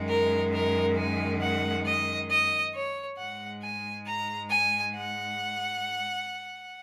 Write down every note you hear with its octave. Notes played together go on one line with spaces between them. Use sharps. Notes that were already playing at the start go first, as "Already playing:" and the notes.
Already playing: F#2 D#3 G#3
A#4
A#4
G#5
F#5
D#5
D#5
C#5
G#2 G#3 F#5
G#5
A#5
G#5
F#5